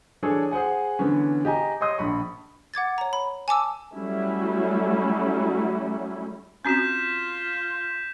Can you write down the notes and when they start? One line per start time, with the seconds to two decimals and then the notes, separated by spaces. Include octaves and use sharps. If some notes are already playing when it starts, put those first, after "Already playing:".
0.22 E3 D4 G#4 A4 C#5
0.51 G#4 C5 F#5 G#5
0.99 D3 E3 B3 C#4
1.45 G4 D#5 G#5 A#5
1.81 C#5 D#5 C6 D#6
1.98 A#1 B5 C#6
2.74 F#5 D6 G#6 A6
2.98 C#5 A#5
3.13 B5
3.48 G#5 A5 D6 E6
3.94 F#3 G3 A3 C#4 E4
6.65 C4 C#4 F4 F#4 G6 B6 E7